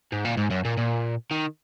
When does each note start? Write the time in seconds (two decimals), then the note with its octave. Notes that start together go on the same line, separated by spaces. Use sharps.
0.12 G#2
0.25 A#2
0.37 G#2
0.51 F#2
0.65 A#2
0.77 A#2
1.31 D#3